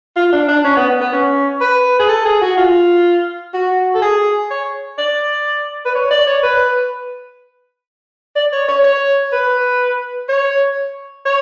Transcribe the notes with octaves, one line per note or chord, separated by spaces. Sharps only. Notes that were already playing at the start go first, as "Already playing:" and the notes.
F4
D4
D4
C#4
B3
B3
B3
C#4
B4
G#4
A4
G#4
F#4
F4
F#4
A4
G#4
C#5
D5
B4
C#5
D5
C#5
B4
D5
C#5
C#5
C#5
B4
C#5
C#5